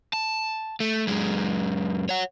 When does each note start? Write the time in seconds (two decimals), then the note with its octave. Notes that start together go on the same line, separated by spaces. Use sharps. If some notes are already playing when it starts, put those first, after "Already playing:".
0.13 A5
0.80 A3
1.07 F#2 G#3
2.09 C#5 F#5